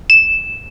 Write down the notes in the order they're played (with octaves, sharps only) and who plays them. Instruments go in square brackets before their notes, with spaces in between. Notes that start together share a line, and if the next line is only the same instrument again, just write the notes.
[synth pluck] E7